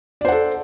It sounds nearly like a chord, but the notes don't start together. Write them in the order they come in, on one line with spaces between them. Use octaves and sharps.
D5 C5 F#5 A4